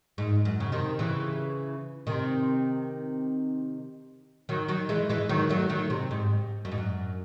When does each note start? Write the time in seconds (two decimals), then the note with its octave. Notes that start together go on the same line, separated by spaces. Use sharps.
0.18 G#2
0.45 F#2
0.60 C#3
0.72 C3 D#3
0.99 C#3 E3
2.07 C3 D#3
4.49 D#3 F#3
4.68 D#3 F#3
4.89 E3 G#3
5.10 E3 G#3
5.29 D#3 F#3
5.49 F#3 A3
5.69 D#3 F#3
5.90 C3
6.11 G#2
6.65 F#2
6.72 G#2
6.78 F#2